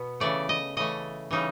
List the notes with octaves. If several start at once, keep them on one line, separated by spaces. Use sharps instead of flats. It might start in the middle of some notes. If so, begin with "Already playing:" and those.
Already playing: B2 B3
C#3 E3 A3 D5
D#5
C#3 E3 A3 D#5
C#3 E3 G3 D#4